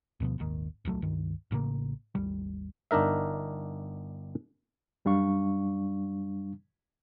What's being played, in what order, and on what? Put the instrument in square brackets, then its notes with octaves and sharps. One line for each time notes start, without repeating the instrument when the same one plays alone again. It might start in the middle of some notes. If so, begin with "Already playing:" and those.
[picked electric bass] D2 B2 F3 B3
D#1 G#1 D#2 D#3
D1 B1 F#3 A3
C#2 G2 D#3
A1 A2 C#3 A#3
G#1 D#2 G3
[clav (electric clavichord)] G1 D4 D#4 A#4 E5
[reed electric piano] F#2 G3 D4 F5 C#6